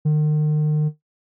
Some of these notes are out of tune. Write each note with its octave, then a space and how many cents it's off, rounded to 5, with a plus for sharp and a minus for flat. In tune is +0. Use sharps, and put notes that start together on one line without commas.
D#3 -40